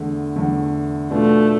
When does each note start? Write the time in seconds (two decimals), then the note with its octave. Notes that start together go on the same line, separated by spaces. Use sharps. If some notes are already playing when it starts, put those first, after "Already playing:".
Already playing: E2 D3 A3
0.36 E2 D3 A3
1.11 B2 A3 B3 D4 F4